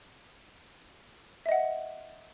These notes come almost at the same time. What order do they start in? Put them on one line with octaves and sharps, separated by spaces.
E5 D#5 F#5